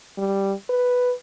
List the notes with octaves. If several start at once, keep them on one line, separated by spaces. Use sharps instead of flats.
G3
B4